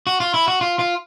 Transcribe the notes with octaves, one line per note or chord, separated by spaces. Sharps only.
F#4
F4
E4
F#4
F4
F4